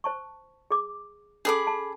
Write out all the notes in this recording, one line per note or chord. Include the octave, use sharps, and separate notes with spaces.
C5 A5 C#6
G#4 D6
C#4 G#4 A4 A5 B5 D6
A5